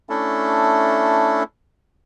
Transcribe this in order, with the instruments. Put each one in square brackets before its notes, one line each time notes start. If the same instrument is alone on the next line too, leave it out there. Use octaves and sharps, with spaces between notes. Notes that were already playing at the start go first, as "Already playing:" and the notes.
[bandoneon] A3 C#4 D4 E4 A4